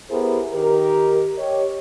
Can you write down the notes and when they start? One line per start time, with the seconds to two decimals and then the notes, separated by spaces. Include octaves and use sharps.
0.10 B3 E4 G4 G#4 A#4 C5
0.54 D#3 G4 A#4
1.38 G4 C#5 D#5